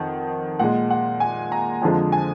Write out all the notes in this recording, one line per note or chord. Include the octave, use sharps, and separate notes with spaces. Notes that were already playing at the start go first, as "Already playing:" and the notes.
Already playing: F2 D#3 F#5
A#2 G#3 F#5
F#5
G#5
A#5
F2 D3 F3 G#3 G#5
G#5